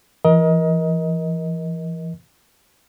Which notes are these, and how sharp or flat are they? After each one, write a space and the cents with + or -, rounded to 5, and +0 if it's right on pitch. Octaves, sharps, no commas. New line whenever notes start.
E3 +30 A#4 +25 D#5 +20